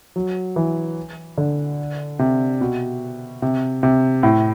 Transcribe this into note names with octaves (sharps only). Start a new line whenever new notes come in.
F#3
E3
D3
C3
B2
C3
C3
A2